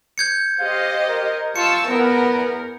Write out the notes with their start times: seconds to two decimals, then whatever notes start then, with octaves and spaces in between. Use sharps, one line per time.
0.18 G6 G#6 C#7
0.59 G4 C5 D#5 F5
1.09 A#4
1.56 F4 A5 C#6 E6 C#7
1.89 E2 B3 A#4